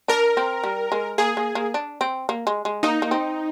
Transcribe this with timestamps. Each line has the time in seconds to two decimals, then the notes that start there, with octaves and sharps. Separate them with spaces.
0.08 D4 A#4
0.37 C4
0.64 G3
0.92 G#3
1.18 A#3 G#4
1.37 A#3
1.55 A#3
1.74 D4
2.01 C4
2.29 A#3
2.47 G#3
2.65 G#3
2.83 A#3 D#4
3.02 A#3
3.11 C4